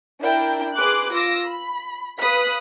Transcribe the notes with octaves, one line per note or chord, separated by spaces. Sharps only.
D4 E4 A#4 G5
G#4 B4 C6 D6 F#6
F4 D6 E6 A#6
B5
B4 F5 B5 D#6 F#6 B6